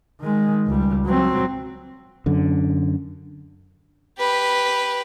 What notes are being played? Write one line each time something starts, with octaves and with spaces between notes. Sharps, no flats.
D#3 G#3
C#2 G3
F#3 C4
F#2 D3
G4 B4